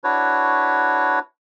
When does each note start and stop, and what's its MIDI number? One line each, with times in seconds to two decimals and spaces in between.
0.04 1.19 62
0.04 1.19 64
0.04 1.19 66
0.04 1.19 71
0.04 1.19 73